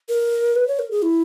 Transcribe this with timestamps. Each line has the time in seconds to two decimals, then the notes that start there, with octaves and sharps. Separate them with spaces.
0.09 A#4
0.56 B4
0.68 C#5
0.79 A#4
0.91 G#4
1.02 E4